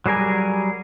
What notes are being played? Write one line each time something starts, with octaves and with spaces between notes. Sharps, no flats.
F#3 G3 G#4 A#4 G#5